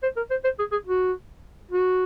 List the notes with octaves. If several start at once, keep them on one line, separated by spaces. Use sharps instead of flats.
C5
A#4
C5
C5
G#4
G#4
F#4
F#4